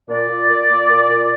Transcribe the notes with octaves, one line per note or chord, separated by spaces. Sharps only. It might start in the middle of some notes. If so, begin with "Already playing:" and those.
A#2 D5
A#2
A#2
A#2
A#2
A#2